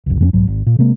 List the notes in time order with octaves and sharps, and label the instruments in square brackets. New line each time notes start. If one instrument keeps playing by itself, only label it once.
[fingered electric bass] F#1 C#2
F2 G#3 C#4
B1 G#2 F#3
G#1
A#2
C3 G#3 A#3